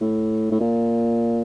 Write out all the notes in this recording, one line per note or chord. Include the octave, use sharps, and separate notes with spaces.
A2
A2
A#2